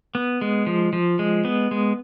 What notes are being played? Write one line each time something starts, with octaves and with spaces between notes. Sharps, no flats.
B3
G#3
F3
F3
G#3
B3
G#3